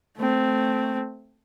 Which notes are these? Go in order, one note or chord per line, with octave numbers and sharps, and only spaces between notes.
A3 C4